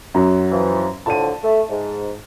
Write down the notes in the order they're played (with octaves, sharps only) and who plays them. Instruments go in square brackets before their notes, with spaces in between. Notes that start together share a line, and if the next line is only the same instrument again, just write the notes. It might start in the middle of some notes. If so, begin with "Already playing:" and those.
[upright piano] F#2 F#3
[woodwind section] E3 F3
[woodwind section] A2 D3 F3 [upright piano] A5 D#7
[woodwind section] A3
G#2